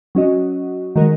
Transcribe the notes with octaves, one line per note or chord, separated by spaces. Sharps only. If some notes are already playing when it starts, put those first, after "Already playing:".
F#3 C#4 F#4 D#5
D#3 G#3 F#4 A#4 D#5